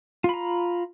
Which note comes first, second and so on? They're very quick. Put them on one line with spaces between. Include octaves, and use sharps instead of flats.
F4 B5 A#5